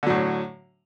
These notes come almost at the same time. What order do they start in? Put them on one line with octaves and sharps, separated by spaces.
D3 F#3 A2